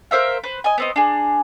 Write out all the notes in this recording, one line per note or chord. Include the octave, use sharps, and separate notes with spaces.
A#4 C5 E5 F5
B4 C5
D#5 G#5
B3 C4 D#5
D4 G#4